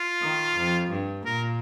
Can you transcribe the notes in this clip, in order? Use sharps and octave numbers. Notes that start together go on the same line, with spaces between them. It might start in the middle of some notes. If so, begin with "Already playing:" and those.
Already playing: F4
D#3
F2
G2
A#2 A#4